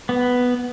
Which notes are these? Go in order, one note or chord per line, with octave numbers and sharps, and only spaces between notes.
B3